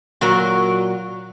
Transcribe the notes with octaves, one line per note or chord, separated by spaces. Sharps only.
A#2 F#3 F#4 A#4